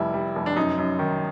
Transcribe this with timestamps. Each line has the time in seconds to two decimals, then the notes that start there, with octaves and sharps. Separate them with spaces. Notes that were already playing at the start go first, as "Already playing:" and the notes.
Already playing: F1 G3 E4
0.14 G3
0.36 F1
0.46 D4
0.56 F#2 D#4
0.78 F#2
0.99 D#3